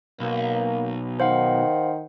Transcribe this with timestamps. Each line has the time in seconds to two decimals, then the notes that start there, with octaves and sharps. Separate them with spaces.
0.20 B1 A#3
1.20 D#3 C5 F5 F#5